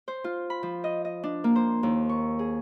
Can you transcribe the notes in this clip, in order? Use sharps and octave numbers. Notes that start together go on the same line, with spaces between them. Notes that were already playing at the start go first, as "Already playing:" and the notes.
C5
F4
B5
F3
D#5
D#5
D4
A#3
C5
D#2
C#6
G#4